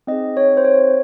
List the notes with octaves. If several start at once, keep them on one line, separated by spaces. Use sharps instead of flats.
C4 D#4 G#4 D#5
C#5
C5
C#5